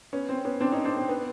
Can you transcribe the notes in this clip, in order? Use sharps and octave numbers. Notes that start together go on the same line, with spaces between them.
B3 C#4
C4
B3 C#4
C4 D4
C#4 D#4
C4 D4
C4
B3